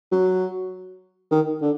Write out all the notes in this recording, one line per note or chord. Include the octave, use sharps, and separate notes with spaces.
F#3
D#3
D3